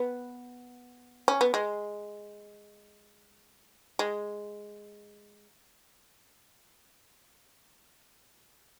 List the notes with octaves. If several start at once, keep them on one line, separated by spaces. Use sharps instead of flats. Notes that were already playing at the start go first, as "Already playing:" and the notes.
Already playing: B3
C#4
B3
G#3
G#3